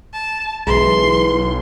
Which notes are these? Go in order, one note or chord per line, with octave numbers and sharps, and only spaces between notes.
A5
B1 E3 G#3 C6